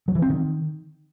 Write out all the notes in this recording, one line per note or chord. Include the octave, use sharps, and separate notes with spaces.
F#3
E3
C4
D#3